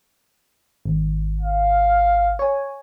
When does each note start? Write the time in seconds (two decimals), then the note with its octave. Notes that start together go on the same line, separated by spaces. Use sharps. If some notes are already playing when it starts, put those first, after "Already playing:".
0.85 G#1
1.41 F5
2.39 C#5 G#5